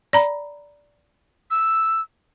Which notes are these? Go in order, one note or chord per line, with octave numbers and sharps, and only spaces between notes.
D5 A#5 B5
E6